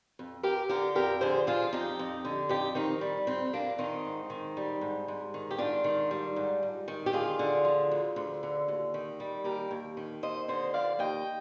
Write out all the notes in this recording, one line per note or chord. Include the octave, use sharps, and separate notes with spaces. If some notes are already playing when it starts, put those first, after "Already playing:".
F2
F2 G4 A#4
D3 G4 A#4
F2 G4 A#4
D3 G#4 C5
F3 F4 G#4
F2 D#4 G4
F2
D3
F2 D#4 G4
D#3 C4 D#4
G3
F2 C4
F2 A#3 D4
D#3 C4 D#4
G#2
D#3
G3
G#2
G#2
D#3
G4
G#2 D4 F4
D#3
G3
G#2
G#2
D#3
G4
D2 F4 G#4
D3
F3
D2
D2
D3
D#2
D#3
G3
D#2 G4 A#4
D#2
D#3
D#2 C5 D#5
D3 C5 D#5
F3 D5 F5
D#2 D#5 G5